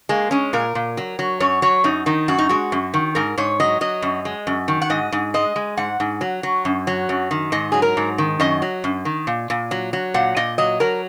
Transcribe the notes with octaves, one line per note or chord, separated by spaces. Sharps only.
G#3 A#3
G#3 C#4
A#2 A#4
A#2
F#3
F#3
F#2 C#5
F#3 C#5
F#2 D#4
D#3 D#4
F#2 F#4
D#4
G#3 F#4
F#2
D#3
G#2 A#4
G#2 C#5
F#3 D#5
F#3 D#5
F#2
G#3
F#2
D#3
F#5
G#2 D#5
G#2
G#3 D#5
G#3
G#2 F#5
G#2
F#3
F#3
F#2
F#3
F#2
D#3
G#2 D#5
F#3 G#4
A#4
G#2
D#3
F#2 D#5
F#3
F#2
D#3
A#2
A#2
F#3
F#3
A#2 F#5
A#2 D#5
F#3 D#5
F#3 A#4